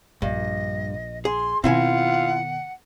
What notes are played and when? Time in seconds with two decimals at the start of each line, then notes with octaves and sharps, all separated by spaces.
0.22 A#1 G2 D#5
1.25 G#4 C6
1.64 B2 D#3 C4 E4 F4 F#5 G#5